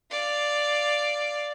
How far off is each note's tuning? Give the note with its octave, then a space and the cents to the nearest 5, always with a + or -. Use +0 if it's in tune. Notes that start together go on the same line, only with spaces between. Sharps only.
D5 +0 F5 +0